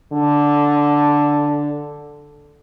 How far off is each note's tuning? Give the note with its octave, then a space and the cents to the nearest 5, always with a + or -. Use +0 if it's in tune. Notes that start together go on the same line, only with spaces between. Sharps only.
D3 -5